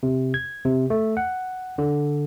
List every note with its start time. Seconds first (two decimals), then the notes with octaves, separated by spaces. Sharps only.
0.03 C3
0.34 G#6
0.65 C3
0.90 A3
1.17 F#5
1.78 D3